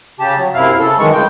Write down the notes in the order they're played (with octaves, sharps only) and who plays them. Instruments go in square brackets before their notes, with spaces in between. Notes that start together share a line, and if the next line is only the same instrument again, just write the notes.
[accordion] C#3 G4 A5
F#3
F#2 C3 E4 F5 F6
C#3 A4
F#2 D#3 E3 G#3 C#6
D2 C#3 G#3 G5 G6